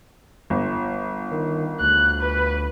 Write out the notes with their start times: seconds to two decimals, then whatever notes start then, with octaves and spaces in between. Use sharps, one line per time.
0.50 G1
1.32 D#3
1.81 D2 F#6
2.21 B4